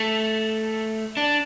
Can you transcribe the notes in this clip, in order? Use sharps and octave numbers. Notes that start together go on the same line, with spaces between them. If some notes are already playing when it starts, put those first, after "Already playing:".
Already playing: A3
D4